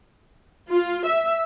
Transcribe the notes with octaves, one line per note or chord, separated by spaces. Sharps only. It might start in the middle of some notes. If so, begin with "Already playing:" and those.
F4
E5